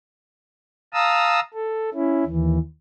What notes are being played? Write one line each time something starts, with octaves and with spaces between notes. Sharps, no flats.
F5 A5 A#5 D#6 E6
A4
C#4 E4
D#2 E3